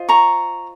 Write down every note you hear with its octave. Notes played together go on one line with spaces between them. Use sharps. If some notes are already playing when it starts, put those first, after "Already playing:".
Already playing: F4 C5 D#5
A#5 C#6